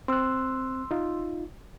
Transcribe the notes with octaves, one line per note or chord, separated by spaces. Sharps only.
C4 C6 E6 F#6
D#4 F4